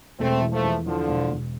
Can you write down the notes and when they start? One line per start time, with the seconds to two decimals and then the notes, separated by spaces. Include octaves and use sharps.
0.19 E1 A3 C4
0.41 E3
0.53 F3 A3
0.64 E2
0.86 D3 E3 F3
1.08 E1
1.31 E1